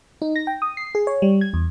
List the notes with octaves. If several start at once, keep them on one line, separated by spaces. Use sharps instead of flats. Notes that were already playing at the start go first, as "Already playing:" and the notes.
D#4
A#6
G5
D#6
C7
G#4
C#5
G3
G#6
E2